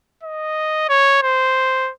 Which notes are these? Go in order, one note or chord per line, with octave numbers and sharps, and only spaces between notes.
D#5
C#5
C5